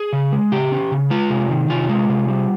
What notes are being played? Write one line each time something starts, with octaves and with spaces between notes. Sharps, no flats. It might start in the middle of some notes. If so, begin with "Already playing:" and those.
Already playing: G#4
C#3
G#3
C#3 G4
C#4
C#3
G#3 F4
C3
D#3
C3 F4
G#3
C3
G3